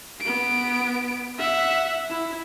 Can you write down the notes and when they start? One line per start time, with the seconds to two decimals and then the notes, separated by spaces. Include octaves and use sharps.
0.21 B3 D7
1.39 E5 F#5
2.10 E4